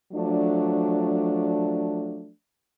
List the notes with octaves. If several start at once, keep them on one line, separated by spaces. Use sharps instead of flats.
F3 F#3 A3 D4